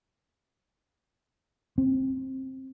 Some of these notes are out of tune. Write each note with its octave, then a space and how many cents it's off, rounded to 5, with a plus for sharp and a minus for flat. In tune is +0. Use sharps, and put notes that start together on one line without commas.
C4 +15